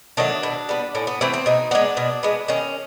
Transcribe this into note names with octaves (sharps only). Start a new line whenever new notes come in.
D#3 F#3 A3 D4
B2
G3 B3
A2 C#4
B3
E3 A3 C4
C4
B2 D#4
G#3 B3 D4
B2
G#3 B3
D#3 C#4